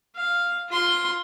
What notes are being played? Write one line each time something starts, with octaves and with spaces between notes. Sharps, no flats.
F5
F4 C6